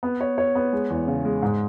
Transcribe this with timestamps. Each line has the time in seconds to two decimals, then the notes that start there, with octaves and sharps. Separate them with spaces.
0.03 B3
0.21 C#5
0.38 C#5
0.55 B3
0.73 G#3
0.90 E2
1.08 C#3
1.25 G#3
1.42 G#2